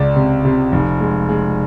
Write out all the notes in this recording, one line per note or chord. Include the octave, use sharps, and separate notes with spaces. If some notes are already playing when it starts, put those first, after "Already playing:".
Already playing: C#2 C#3 D5
C3
C3
F1
G#3
G#3